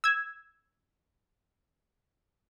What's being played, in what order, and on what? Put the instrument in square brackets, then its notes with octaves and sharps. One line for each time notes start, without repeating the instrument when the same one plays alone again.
[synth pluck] E6 G#6